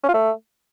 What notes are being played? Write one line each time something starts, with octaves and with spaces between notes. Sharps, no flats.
C#4
F4
A3